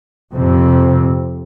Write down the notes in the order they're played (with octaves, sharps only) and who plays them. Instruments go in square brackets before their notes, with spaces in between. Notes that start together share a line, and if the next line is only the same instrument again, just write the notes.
[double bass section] F2 C3